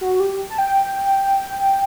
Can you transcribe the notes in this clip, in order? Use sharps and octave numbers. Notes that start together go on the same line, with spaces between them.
F#4
G4
A5
G5